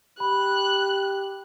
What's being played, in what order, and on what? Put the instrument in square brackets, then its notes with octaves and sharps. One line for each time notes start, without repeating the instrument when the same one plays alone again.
[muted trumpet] G4 [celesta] B5 [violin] F#6